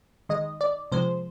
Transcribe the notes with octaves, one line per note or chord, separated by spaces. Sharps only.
D#3 G#3 D#5
D5
C3 F3 G#3 C5